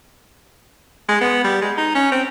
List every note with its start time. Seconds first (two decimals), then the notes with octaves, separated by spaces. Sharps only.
1.09 G#3
1.21 B3
1.44 G3
1.61 G#3
1.78 D#4
1.95 C#4
2.12 C4